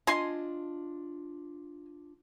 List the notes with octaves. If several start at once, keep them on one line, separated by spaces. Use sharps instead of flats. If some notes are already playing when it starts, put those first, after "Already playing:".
D4 F4 D#5 G#5 C6